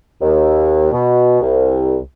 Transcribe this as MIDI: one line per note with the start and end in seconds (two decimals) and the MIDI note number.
0.21 0.91 39
0.92 1.38 47
1.41 1.96 36